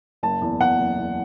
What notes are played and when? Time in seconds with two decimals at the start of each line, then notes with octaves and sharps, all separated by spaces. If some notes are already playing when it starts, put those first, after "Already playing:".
0.23 F#1 A5
0.41 E2
0.60 E2 F#5
0.79 F#1
0.98 E2